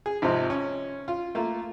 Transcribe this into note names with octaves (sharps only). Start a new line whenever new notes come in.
G#4
G#1 C3 F3
C#4
F4
A3 A#3 F4